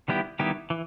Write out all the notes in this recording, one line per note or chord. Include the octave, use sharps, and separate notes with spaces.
D#3 G3 B3 E4 G4
D#3 G3 B3 E4 G4
E3